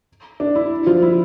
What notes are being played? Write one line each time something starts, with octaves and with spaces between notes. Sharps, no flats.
D4
E4
F3 F4
E4